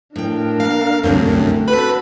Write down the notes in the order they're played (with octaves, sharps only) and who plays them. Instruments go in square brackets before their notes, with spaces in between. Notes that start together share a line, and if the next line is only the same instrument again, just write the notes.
[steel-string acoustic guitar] A2 G5 [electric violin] D4 A#4
[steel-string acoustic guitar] A#3 [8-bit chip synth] F5
[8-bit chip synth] C2 F#2 [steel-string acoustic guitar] D3 A3 C4
[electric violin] F#4 A4 [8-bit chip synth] B4 B5